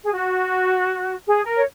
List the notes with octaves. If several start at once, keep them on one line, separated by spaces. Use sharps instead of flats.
G#4
F#4
G#4
A#4
C#5